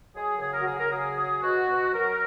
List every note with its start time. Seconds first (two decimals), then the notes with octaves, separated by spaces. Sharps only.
0.15 F#3 G#4
0.36 A#4
0.40 C#3 G#4
0.53 A#4
0.61 F#4
0.66 C#3 G#4
0.79 A#4
0.91 F#3 G#4
1.17 F#3 G#4
1.42 B2 F#4
1.68 B2
1.93 F#3 A#4